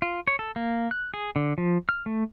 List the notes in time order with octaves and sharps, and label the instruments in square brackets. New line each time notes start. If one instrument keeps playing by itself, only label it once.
[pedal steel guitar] F4
C#5
A4
A#3
F#6
G#4
D3
F3
F6
A3